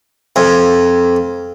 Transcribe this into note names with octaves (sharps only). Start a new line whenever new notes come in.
F2